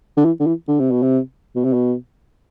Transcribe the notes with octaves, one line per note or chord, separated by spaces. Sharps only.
D3
E3
D3
E3
D3
C3
B2
C3
B2
C3
B2